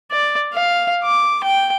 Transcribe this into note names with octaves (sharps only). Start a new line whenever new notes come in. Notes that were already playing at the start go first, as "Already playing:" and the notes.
D5
F5
D6
G5